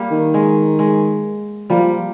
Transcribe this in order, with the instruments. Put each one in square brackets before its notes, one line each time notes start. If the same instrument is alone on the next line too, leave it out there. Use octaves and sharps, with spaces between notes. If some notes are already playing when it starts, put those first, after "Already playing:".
Already playing: [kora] G3 A#3
[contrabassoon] D#3
[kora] G#3
G#3
[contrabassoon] F3 [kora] G3 A#3